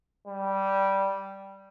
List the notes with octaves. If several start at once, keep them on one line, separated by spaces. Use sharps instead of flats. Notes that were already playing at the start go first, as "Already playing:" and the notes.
G3